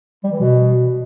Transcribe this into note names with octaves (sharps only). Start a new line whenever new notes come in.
G3
E3
B2